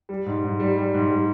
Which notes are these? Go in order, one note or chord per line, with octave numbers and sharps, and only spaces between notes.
G3
G#2
G#2
G3
G3
G#2
G3